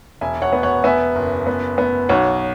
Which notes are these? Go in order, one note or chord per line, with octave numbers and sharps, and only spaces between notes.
E1 E5 G#5
C#5 F#5
B3
C#5 F#5
B3 E5 G#5
F#1
B3
B3
B1 C#5 F#5